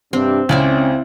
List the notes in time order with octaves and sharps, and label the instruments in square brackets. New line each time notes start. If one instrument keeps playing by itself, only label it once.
[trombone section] G2 C3 [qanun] C4 [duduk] D4
[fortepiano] C#2 [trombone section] C4 [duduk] C#4 [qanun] E4 D5 E5